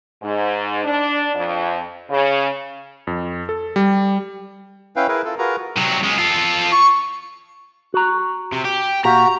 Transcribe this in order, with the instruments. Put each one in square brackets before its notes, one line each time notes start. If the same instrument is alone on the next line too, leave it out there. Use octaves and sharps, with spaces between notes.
[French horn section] G#2
D4
F2
C#3
[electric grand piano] F2
A4
G3
[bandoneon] C#4 E4 B4 F5 G5
E4 G#4 A#4 B4
E4 F4 A4
F4 F#4 G#4 A#4 B4 A#5
[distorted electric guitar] C3 F#3
G#3 C#4
F4 A4
[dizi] C#6
[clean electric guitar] F#4 A#5
[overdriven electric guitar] C3
G4
[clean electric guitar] A#2 G4 F5 [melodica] F#4 [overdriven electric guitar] A#5